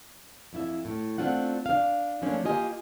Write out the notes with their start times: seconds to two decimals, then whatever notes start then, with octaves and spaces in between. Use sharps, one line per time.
0.53 F2 E4 E5
0.85 A2
1.18 A3 C4 D4 F4 F#5
1.66 D4 F5
2.22 F3 A3 A#3 C#4 D4
2.44 A#3 F4 G4 D#5 G#5